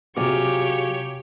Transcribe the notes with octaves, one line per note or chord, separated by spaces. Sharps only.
C3 F#3 F4 G4 G#4 C#5 D6